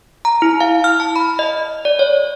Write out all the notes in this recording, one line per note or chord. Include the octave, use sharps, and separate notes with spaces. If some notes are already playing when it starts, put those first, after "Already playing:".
A#5
E4
F5
F6
A5
B5
D#5
D5
C#5